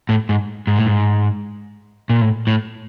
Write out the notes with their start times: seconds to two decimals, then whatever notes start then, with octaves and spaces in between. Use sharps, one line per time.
0.09 A2
0.29 G#2
0.67 G#2
0.76 A2
0.87 G#2
2.09 A#2
2.21 A2
2.47 A2